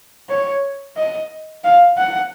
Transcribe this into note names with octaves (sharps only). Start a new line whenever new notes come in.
C#5
D#5
F5
F#5